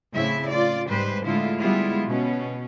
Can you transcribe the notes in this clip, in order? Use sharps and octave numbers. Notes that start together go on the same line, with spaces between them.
A2 C#3 C4 E4 E5
F4 D5
G#2 G3 B4 C5
A2 D3 G#3 E4 F4
G3 G#3 B3 E4 F4
B2 C#4